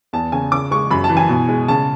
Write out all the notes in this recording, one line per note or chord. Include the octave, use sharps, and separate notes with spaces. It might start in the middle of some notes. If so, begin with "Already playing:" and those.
E2 A5
C#3 G#5
C#3 D6
G#3 C#6
F#2 B5
A5
E3
G#5
B2
G#3
C#3 A5